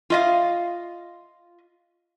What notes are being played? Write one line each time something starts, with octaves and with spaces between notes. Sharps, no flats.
F4 D#5 F5